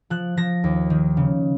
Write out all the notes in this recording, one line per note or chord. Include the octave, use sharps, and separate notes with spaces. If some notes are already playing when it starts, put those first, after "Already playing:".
F3 F#6
F3 A#6
D#2
D#3
C#3